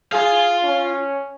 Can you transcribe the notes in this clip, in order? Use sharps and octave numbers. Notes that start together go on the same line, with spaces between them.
F4 G#4 F5
C#4